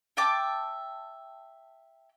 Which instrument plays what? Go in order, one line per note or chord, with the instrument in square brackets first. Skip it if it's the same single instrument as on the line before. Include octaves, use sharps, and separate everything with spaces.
[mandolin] E5 G5 A5 D6